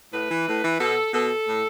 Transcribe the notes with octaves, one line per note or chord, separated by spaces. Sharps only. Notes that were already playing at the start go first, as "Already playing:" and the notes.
A2 B4
E3
A2
E3
B2 A4
B2 A4
A2